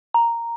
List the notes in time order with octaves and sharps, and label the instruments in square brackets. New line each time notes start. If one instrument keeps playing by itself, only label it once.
[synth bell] A#5